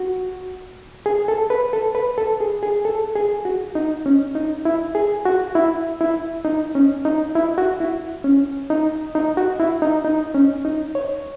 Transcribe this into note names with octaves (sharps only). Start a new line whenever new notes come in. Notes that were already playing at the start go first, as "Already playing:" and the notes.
Already playing: F#4
G#4
A4
B4
A4
B4
A4
G#4
G#4
A4
G#4
F#4
D#4
C#4
D#4
E4
G#4
F#4
E4
E4
D#4
C#4
D#4
E4
F#4
E4
C#4
D#4
D#4
F#4
E4
D#4
D#4
C#4
D#4
C#5